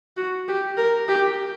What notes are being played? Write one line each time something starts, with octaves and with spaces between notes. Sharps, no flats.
F#4
G4
A#4
G4